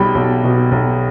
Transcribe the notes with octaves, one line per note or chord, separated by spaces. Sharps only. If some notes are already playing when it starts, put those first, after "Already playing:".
Already playing: B1 B2 G3 G5 B5
B1
B2
B1